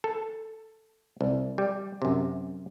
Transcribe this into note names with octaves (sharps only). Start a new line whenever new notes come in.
A4
C2
G3
F#2 C3